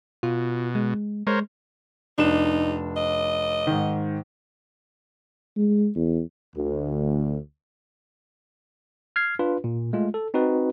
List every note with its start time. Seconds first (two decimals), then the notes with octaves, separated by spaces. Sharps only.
0.23 B2 F4
0.75 G#3
1.27 G#3 A#4 C5 C#5
2.18 F1 D4 D#4 E7
2.96 D#5
3.67 G#2 D#3
5.56 G#3
5.95 E2
6.56 D2
9.16 F6 G#6 C7
9.39 D4 F4 B4
9.64 A#2
9.93 G#3 A3 F4
10.14 A4
10.34 C4 D#4 F#4 B4